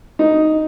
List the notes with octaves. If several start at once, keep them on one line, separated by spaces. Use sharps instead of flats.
D#4